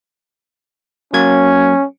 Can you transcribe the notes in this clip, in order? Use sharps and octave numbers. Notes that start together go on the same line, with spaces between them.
F#3 A#3 C#4 G#6